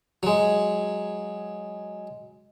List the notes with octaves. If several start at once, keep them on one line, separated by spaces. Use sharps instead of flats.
F#3 G#3